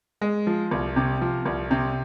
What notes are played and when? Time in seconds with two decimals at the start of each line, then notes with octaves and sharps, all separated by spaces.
0.21 G#3
0.47 F3
0.71 C2
0.96 C3
1.21 F3
1.45 C2
1.71 C3